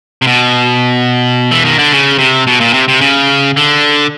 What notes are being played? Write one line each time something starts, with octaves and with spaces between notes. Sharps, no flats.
C3
B2
E3
D#3
D3
C#3
C3
B2
A#2
C3
C3
C#3
D3